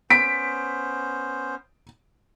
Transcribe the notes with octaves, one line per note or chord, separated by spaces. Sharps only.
B3 C#4 C5 B6 D7